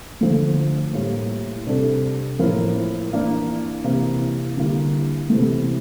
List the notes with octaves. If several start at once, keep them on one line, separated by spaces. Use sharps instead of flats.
D3 F3 A3
A2 G3 A#3 E4
C3 G3 D4 A4
A2 F3 A#3 E4 A#4
E3 A#3 D4
C3 E3 A#3
D3 G3 A#3 E4
C3 E3 A3